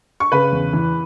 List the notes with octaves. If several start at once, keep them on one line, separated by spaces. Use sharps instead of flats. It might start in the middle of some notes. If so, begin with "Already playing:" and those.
C#6
C#3 B4 B5
E2
E3